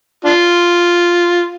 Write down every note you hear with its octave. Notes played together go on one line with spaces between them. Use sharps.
D4 F4